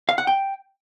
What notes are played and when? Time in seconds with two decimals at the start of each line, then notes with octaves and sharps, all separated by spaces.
0.09 F5
0.18 F#5
0.27 G5